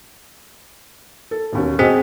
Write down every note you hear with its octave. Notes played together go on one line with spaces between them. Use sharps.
A4
E1 D#2 C#4
E1 C4 F#4 G#4 D#5